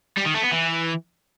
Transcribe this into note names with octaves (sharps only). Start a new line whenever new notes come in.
G3
D#3
A3
B3
E3